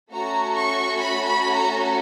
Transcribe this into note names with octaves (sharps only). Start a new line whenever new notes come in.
A3 C#4 F#4 A4 A#5
C#6
B5
B5
A#5